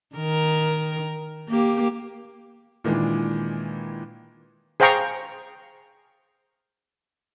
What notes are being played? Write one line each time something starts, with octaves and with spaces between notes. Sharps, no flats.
D#3 A#4
A#3 G4
A#2 D#3 E3 G#3 D4
G#4 C5 F5 G5 A#5 C#6